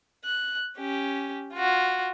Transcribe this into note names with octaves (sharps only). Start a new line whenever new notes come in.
F#6
C#4 G4
F4 F#4